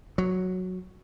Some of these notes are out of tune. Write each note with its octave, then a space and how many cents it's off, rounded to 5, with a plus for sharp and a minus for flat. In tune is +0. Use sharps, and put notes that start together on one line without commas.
F#3 -5